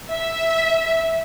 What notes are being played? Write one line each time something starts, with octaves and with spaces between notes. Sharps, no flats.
E5